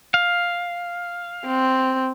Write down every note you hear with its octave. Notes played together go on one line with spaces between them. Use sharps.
F5
C4